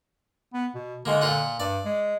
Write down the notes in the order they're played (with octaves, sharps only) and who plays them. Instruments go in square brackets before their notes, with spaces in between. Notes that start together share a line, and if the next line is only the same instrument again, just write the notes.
[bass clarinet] B3
B2
[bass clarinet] D3 [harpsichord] D#3 G#3 A#3
[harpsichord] A#2 F4 F#5
[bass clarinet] G2 [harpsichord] D5
[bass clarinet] G#3